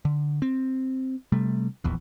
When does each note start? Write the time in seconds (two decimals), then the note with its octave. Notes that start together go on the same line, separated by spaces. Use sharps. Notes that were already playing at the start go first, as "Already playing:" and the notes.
0.05 D3
0.42 C4
1.32 C3 G3 A3
1.84 D#1 A#1 E2